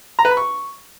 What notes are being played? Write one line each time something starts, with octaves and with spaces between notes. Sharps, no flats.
A#5
B4
B5
C#6